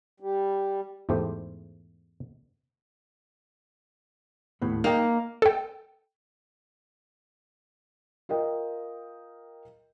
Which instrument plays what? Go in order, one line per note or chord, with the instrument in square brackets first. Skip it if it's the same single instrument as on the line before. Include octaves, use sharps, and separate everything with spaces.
[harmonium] G3
[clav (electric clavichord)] E2 G#2 A3 G4 C5
[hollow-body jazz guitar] D#2 A2 B3
[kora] A#3 [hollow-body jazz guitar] D#4 D#5 G5
[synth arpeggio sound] A4 G5
[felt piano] F4 A#4 D#5 G5